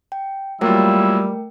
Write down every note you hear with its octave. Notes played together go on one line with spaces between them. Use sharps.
G5
F#3 G3 A3 A#3 E4 F4 A#4 G5